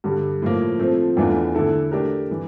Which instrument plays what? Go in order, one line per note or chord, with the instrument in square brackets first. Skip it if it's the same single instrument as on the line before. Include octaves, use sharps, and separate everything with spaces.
[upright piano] G2 D3 G3
A2 F3 A#3
F3 A3 C4
E2 E3 A3 D4 F4
D3 A3 E4 A4
A3 D4 G4 A#4
E3